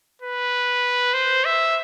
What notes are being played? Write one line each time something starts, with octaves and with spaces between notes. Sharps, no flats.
B4
C5
E5